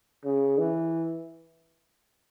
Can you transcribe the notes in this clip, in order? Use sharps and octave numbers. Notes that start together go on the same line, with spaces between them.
C#3
E3